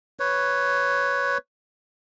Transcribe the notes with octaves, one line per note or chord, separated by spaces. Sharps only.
B4 C#5